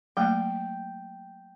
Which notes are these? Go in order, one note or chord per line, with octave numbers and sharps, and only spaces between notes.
F#3 A3 A#3 G5